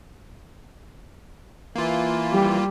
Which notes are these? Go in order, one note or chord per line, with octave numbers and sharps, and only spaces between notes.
E3 A#3 F4
G3 G4